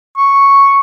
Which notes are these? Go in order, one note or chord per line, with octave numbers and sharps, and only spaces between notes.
C#6